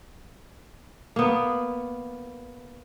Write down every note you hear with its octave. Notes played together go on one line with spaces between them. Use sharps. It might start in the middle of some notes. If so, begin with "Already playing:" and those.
A#3 B3